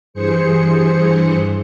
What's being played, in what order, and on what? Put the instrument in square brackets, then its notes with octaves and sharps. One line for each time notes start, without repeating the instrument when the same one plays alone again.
[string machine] G2 E3 G#4 C5 C#7